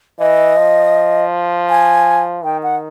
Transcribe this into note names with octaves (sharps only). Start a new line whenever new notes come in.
E3 D#5
F3
G#5
D#3 G5
F#5